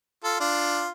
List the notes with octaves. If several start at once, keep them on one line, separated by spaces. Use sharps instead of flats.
F4 A4
D4 F4